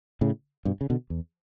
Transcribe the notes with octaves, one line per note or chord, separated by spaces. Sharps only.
A2 C#3
G2 B2
C#3
B2 D3
E2